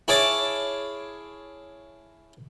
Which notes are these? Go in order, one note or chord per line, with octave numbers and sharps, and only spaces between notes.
E4 G#4 C#5 F5 A5 D6